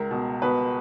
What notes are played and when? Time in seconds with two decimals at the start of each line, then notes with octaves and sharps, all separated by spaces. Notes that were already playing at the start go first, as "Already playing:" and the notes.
Already playing: C#2 A#4
0.11 B2
0.42 B2 B4